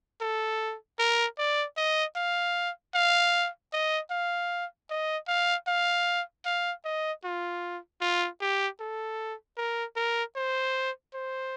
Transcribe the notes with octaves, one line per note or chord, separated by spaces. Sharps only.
A4
A#4
D5
D#5
F5
F5
D#5
F5
D#5
F5
F5
F5
D#5
F4
F4
G4
A4
A#4
A#4
C5
C5